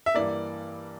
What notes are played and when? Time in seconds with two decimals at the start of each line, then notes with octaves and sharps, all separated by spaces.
0.06 E5
0.14 G2 E3 A#3 D5